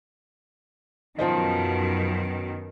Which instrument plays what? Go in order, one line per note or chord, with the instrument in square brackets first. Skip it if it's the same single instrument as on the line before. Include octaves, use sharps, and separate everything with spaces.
[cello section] F#2 B2 D#3 [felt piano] F3 C5 D#5